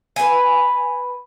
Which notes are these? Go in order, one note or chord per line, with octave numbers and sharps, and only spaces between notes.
B4 G#5